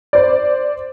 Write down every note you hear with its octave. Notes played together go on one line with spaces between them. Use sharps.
C5 D5